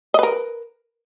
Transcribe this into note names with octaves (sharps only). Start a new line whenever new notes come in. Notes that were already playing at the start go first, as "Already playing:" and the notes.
A#4 B4 D#5